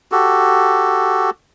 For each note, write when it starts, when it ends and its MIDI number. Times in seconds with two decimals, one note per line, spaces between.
0.12 1.30 66
0.12 1.30 67
0.12 1.30 69